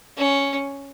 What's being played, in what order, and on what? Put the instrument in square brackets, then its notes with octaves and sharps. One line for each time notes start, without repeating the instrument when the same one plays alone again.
[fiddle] C#4